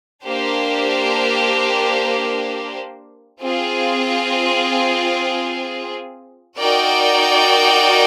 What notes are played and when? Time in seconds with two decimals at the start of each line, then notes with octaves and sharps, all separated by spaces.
0.25 A#3 D4 G4 C5
3.41 C4 F4 G#4
6.57 D#4 F#4 A#4 D5 G5